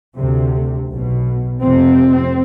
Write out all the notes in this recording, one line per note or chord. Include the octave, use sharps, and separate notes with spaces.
D2 C3
B1 B2
F1 F2 C3 C4